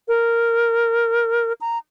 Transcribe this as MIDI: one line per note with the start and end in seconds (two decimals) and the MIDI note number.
0.08 1.53 70
1.61 1.78 82